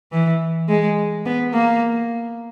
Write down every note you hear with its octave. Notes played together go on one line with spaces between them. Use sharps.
E3
G#3
B3
A#3